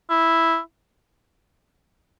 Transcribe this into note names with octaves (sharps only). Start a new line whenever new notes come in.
E4